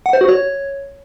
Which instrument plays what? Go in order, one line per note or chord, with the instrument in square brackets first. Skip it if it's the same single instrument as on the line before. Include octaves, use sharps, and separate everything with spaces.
[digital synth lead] F#5
C5
F#4
C#5